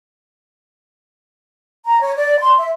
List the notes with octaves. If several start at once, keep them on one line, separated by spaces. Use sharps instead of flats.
A#5
C#5
D5
C6
E5